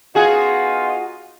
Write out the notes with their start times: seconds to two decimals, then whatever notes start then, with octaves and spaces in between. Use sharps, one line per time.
0.15 B3 D#4 F4 F#4 G#4